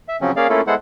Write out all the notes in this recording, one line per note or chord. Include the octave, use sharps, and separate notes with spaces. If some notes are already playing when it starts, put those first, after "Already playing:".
E5
C#3 F3 F#3 C4 C#4
A#3 C#4 G#4 D5 F5
A3 A#3 C#4 E4 F4 A4
G#3 B3 E4 A4 C5 F#5